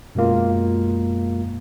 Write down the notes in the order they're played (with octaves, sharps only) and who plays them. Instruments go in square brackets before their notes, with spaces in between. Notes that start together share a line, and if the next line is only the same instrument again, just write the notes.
[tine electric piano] F#2 B2 G#3 A#3 F4